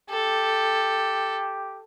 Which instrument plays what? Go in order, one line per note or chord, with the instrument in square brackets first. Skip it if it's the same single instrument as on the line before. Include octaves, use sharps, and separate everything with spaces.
[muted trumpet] G4 [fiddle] A4